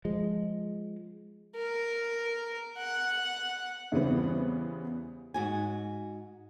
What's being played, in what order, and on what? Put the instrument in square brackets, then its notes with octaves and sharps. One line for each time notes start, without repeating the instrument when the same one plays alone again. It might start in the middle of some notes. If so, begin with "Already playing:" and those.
[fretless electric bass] F3 G#3
[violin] A#4
F#5
[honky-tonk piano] E2 C#3 E3 G3 B3 C4
[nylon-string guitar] G#2 F#4 G#5